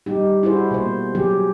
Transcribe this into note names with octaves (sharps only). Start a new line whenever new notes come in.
G3 D#4 G4
E4 F#4 G#4 C5
B2 A#3 C5
F#3 G4 G#4